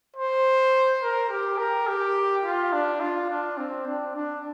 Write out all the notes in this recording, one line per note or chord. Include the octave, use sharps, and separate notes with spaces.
C5
A#4
G4
A#4
G4
F4
D4
F4
D4
C4
D4
D4